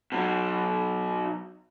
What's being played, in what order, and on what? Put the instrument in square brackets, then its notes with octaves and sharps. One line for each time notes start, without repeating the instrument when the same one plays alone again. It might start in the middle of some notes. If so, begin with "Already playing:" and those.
[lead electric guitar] B2 F#3